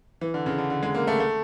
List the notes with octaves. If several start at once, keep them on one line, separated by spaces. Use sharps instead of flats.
E3
D3
C#3
D3
D3
G#3
A#3
A3
A3